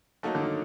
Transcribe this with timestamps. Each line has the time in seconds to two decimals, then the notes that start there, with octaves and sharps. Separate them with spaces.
0.23 F#3 A3 A#3 D#4 F#4 A4
0.35 D3
0.41 D#3